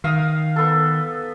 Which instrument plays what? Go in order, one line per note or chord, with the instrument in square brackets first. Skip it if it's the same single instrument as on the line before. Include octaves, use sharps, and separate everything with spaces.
[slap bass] D#3 [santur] F5 D#6
[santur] B3 A4